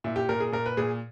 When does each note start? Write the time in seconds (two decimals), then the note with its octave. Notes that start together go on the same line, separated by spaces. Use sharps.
0.04 A#2 E4
0.16 G4
0.29 A#2 A#4
0.40 G#4
0.52 A#2 A#4
0.66 B4
0.77 A#2 G#4